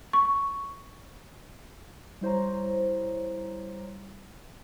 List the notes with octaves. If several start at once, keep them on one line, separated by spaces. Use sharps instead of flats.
C#6
G3 E4 C5 C#5 A#5